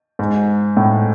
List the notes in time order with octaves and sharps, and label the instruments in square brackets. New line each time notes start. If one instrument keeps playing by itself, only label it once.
[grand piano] G#2
A2